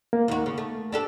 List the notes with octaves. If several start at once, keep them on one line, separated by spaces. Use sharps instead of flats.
A#3
D#2 F#4
C#3
A3
D4 G4 A4